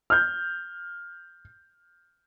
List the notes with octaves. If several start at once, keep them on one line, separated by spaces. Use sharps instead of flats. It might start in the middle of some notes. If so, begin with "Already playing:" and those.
F6 G6